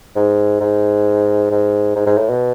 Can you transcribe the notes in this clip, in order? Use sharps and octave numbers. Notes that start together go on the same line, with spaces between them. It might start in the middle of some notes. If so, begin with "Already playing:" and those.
G#2
G#2
G#2
G#2
G#2
A2
B2